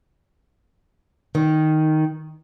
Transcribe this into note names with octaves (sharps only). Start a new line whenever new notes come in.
D#3